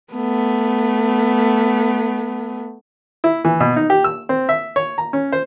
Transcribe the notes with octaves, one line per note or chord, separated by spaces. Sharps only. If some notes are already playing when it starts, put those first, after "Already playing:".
A3 B3
E4
E3
B2
D#4
G4
E6
C4
E5
C#5
A#5
C#4
C5